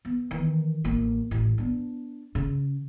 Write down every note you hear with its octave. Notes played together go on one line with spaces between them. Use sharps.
B3
D#3 E3
A1 A#3
A1
B3 D4
C#3